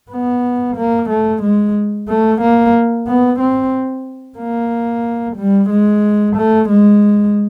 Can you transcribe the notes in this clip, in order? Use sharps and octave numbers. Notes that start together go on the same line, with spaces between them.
B3
A#3
A3
G#3
A3
A#3
B3
C4
A#3
G3
G#3
A3
G#3